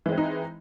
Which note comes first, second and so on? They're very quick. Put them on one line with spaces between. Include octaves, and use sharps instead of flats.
E3 G#3 C4 E4 D#4